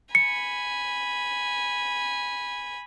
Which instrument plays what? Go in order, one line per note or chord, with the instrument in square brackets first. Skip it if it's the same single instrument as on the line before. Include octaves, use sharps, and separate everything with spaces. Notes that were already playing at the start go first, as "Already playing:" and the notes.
[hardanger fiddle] G#5 B5 [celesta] C#7